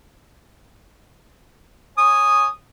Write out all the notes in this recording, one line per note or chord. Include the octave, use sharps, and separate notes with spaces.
C#5 G#5 D#6